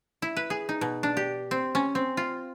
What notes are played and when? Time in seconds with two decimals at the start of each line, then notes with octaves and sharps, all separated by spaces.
0.22 E4
0.36 B4
0.50 G#4
0.69 D#4
0.81 B2
1.03 D4
1.17 G4
1.51 C4
1.75 C#4
1.95 C4
2.17 F4